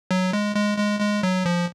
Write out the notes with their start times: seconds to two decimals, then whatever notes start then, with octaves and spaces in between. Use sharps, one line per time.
0.11 F#3
0.33 G#3
0.56 G#3
0.78 G#3
1.00 G#3
1.23 F#3
1.46 F3